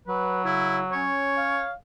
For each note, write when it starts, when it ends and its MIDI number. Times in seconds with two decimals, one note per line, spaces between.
0.08 1.10 54
0.08 0.45 71
0.45 0.84 49
0.45 0.79 64
0.92 1.63 61
0.92 1.71 73
1.37 1.73 77